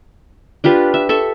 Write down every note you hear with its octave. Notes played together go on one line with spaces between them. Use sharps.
D4 F4 G4 B4
E5
A4 E5 C#6